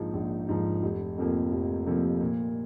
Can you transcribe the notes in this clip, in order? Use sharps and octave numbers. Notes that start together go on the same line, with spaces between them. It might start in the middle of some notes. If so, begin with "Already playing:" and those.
Already playing: A#1 G#2 F3
A#1
G#2 F3
F1
F2 C3 F3 A#3
F1
F2 C3 F3 A#3
A#2